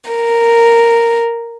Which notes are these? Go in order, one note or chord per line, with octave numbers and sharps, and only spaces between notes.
A#4